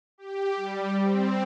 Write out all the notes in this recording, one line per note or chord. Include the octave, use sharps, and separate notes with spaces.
G4
G3
C4